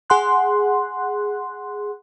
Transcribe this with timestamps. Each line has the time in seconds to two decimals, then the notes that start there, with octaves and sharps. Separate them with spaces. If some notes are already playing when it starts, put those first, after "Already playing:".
0.10 G#4 F#5 C6 F#6